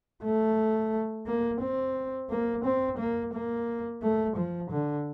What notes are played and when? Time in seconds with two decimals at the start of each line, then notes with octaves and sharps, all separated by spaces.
0.24 A3
1.27 A#3
1.61 C4
2.30 A#3
2.65 C4
2.99 A#3
3.34 A#3
4.02 A3
4.37 F3
4.71 D3